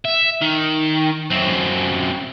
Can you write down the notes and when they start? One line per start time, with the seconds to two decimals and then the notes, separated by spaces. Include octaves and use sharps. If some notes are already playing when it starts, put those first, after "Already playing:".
0.05 E5
0.42 D#3
1.31 F#2 C4